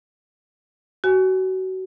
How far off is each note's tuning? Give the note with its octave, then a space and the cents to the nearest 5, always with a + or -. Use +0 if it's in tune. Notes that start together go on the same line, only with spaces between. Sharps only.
F#4 +25 G#5 +0